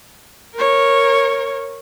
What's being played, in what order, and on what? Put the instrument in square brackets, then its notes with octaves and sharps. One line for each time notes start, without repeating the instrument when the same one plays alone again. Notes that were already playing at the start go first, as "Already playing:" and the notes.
[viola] A#4 C#5